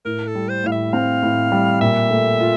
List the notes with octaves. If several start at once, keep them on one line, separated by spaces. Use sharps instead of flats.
A2 A#4
A4
G3
C5
A2 F5
E5
C4 F5
A2
G3
A#2 E5
A3
F4